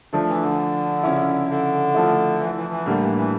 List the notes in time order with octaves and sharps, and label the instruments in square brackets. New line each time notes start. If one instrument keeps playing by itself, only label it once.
[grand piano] F3 A3 D4
[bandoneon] E3
D3
[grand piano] C#3 F3 C#4 E4
[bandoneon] D3
[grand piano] F3 A3 E4
[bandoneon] E3
E3
E3
[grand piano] A2 G3 A#3 D4 [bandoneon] D3
[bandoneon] E3
E3